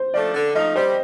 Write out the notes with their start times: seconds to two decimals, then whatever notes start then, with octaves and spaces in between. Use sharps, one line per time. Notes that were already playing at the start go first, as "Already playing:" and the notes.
Already playing: C5
0.14 F3 A3 D4 A4 D5
0.34 D3
0.55 F3 A3 D#4 D#5
0.75 G3 C5